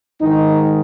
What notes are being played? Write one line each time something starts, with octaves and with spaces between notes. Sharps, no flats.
G#2 D#3 D#4